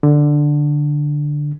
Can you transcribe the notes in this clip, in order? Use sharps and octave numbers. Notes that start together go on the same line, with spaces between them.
D3